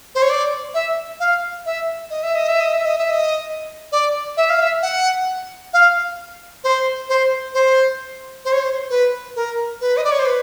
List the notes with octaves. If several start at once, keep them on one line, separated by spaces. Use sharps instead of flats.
C5
C#5
D5
E5
F5
E5
D#5
E5
D#5
E5
D#5
E5
D#5
E5
D#5
D5
E5
F5
E5
F#5
F5
C5
C5
C5
C5
C#5
C5
B4
A#4
B4
D#5
D5
C#5
C5
B4